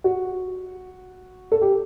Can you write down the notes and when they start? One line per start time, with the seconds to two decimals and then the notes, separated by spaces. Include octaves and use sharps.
0.04 F#4
1.52 A4
1.62 G4